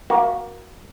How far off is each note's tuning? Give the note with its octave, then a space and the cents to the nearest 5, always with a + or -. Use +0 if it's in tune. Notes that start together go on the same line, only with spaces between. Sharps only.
A#3 +15 F#4 +0 E5 +0